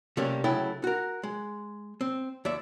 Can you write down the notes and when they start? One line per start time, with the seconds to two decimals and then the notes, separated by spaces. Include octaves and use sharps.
0.17 C3 G3 A3 A#3 C#4 G4
0.44 C#2 C#3 F#3 A3 E4 G5
0.84 F#4 A#4
1.23 G#3
2.01 C4
2.45 D#2 D5 E5